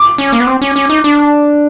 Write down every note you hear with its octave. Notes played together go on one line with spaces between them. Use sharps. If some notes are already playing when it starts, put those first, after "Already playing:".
Already playing: D6
C#4
A#3
B3
C4
C#4
C#4
D#4
D4